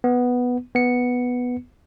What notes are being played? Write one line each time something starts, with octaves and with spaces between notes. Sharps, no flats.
B3
B3 C#7